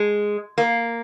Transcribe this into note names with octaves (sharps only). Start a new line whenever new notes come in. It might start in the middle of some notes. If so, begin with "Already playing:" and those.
Already playing: G#3
A#3